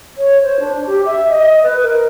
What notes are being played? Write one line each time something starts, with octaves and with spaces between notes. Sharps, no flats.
C#5
C5
D4
G4
E5
D#5
B4
A#4